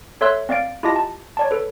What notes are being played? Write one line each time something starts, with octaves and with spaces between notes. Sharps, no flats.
A4 C#5 E5 C6 E6 F#6
C4 D5 F5 A6 D7
E4 F4 G4 D#5 A5 A#6
A5
C#5 D5 A5
A4 B4